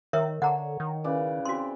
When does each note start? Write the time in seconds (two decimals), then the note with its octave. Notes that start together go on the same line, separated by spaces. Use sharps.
0.13 D#3 A#4 C#5 E5
0.42 D3 C#5 F#5 A#5
0.80 D#3
1.04 C#3 E3 D5
1.45 C4 F#4 C6